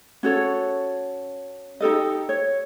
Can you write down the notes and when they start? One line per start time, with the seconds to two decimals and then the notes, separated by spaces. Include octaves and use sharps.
0.23 C#4 F#4 A4 C#5
1.81 D#4 G4 A4 D#5
2.29 C#5